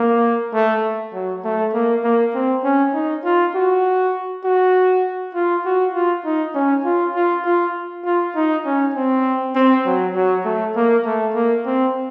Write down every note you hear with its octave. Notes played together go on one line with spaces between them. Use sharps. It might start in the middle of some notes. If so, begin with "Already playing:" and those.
Already playing: A#3
A3
F#3
A3
A#3
A#3
C4
C#4
D#4
F4
F#4
F#4
F4
F#4
F4
D#4
C#4
F4
F4
F4
F4
D#4
C#4
C4
C4
F#3
F#3
A3
A#3
A3
A#3
C4